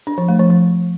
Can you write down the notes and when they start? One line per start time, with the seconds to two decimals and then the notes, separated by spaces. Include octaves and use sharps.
0.07 D4
0.18 F3
0.28 A3
0.39 F3
0.50 F3